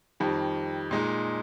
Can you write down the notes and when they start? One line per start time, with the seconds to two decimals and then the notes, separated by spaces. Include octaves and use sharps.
0.20 F2 D#3 G3
0.91 A#2 G#3 D#4